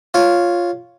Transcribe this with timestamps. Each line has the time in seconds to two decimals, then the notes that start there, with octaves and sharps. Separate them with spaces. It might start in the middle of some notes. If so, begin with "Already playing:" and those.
0.14 F4 C#5